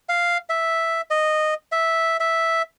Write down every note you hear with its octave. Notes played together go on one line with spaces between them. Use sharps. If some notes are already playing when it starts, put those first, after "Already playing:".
F5
E5
D#5
E5
E5